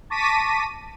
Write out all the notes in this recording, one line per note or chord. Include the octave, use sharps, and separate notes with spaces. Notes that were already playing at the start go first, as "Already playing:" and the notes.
A5 C#6 D6 A#6 B6 D#7